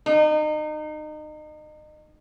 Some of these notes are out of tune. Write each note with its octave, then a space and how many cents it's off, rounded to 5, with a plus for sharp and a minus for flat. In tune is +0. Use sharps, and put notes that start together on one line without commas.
D#4 -30